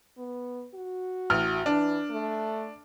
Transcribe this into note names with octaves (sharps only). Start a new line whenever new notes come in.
B3
F#4
A1 F6
E3 D4
A3